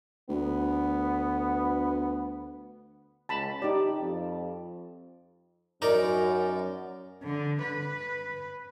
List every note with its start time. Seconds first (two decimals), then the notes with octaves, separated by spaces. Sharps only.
0.29 D2 B3
3.29 C#2 A5 B5
3.62 D#4 G4 D5
4.00 F2
5.82 F#2 D#4 A#4 D5
7.23 D3
7.62 B4